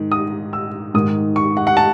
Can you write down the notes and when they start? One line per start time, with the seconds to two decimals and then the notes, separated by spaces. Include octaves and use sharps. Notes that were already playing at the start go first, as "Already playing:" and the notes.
Already playing: G#2 D#3
0.12 D#6
0.53 E6
0.94 G#2 D#3 D#6
1.36 C#6
1.57 F#5
1.67 F#5
1.77 A5